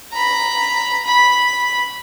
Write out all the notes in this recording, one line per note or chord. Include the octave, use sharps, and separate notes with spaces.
A#5 B5
B5